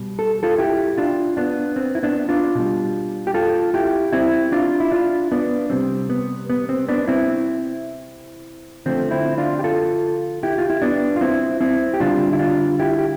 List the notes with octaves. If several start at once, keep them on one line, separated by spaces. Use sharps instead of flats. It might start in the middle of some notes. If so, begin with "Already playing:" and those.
Already playing: B2 G3
A4
F4 A4
E4 G4
D4 F4
B3 D4
C4
E4
B3 D4
D4 F4
B2 G3
G4
F4 A4
E4 G4
C4 E4
D4 F4
E4
D4 F4
B3 D4
C3 G3 C4
B3
B3
C4
B3 D4
C4 E4
D3 F3 A3 C4
C4 E4
D4 F4
G4
F4 A4
E4 G4
F4
E4
B3 D4
F4
C4 E4
C4 E4
G4
D3 G3 D4 F4
E4
D4 F4
E4 G4
G4